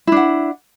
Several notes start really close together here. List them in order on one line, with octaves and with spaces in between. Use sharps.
E4 D4 F#5